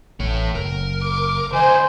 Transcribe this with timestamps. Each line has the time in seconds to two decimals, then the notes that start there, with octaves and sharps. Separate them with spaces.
0.20 A1 A3 C#5
0.55 F#1 A#4
1.02 D6
1.53 D2 C5 D#5 G#5